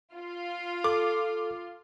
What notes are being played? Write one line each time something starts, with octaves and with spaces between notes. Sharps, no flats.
F4
A4 D6